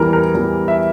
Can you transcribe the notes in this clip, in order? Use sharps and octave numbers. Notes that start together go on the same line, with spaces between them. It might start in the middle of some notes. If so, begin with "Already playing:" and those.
Already playing: E2 E3 G3 A#4
A#4
E2 E3 G3
E5